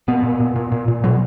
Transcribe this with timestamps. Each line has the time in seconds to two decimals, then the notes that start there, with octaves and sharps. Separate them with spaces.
0.08 A#2 B3
0.23 A#2
0.40 A#2
0.56 A#2
0.72 A#2
0.88 A#2
1.04 B2 F#3